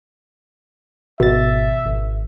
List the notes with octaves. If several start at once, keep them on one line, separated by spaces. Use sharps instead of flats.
G#1 B2 E5 A6
G#1